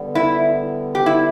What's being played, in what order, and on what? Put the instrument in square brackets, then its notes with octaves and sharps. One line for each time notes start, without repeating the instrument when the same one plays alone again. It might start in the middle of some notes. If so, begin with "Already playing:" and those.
Already playing: [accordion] D3 G3 B3
[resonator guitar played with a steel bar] E4
G4
E4